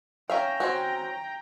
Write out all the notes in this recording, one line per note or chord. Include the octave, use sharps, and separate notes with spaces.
C#4 E5 F5 G5 A#5
C4 C#4 F#4